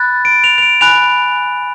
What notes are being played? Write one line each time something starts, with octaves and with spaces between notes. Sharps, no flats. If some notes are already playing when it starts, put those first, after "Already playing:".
Already playing: B5 F#6 A6
D7
F7
F7
D7
G#5 B5 F#6 F7